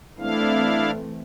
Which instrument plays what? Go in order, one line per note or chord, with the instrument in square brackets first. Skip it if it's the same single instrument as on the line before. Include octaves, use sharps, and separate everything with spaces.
[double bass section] E3 A3 C4 [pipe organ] D4 E4 F5